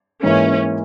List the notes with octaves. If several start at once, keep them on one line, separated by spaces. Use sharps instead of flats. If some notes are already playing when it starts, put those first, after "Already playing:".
G#2 E3 A#3 C#4 E4